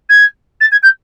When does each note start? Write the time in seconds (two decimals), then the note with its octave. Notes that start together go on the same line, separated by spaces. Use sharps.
0.09 G#6
0.61 A6
0.72 G#6
0.83 G6